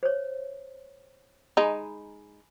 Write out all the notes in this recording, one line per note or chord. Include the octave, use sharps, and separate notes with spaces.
C5 C#5
G#3 D#4 G#5 A#5 B5